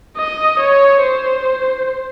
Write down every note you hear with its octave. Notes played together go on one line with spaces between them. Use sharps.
D#5
C#5
C5